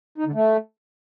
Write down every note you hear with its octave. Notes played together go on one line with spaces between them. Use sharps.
D#4
D3
A3